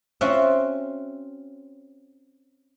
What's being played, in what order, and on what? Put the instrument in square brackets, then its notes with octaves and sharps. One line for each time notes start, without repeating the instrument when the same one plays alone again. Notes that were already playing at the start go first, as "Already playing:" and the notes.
[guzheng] C4 C#4 F4 F#4 E5